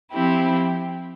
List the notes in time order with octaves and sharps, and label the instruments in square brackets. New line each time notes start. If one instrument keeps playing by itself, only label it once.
[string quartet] F3 C4 E4 G4